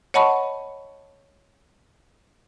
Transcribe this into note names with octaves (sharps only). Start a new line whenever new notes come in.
C#5 D#5 F#5 A5 B5 C#6